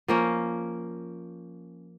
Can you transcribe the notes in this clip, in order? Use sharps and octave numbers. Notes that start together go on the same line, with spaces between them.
F3 A#3 C#4